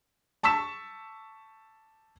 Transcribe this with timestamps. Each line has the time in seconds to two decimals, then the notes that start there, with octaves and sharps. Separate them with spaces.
0.43 A5 C#6 E6 B6 E7